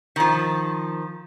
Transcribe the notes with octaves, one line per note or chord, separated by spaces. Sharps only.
D#3 F3